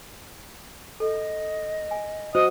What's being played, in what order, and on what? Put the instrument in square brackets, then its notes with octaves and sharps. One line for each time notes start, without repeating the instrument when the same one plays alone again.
[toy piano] A4 [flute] D#5
[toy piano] G#5
[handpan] F#4 [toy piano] C5 [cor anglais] D#5